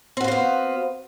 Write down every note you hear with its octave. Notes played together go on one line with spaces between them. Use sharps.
B3 C4 F#4 C5 F5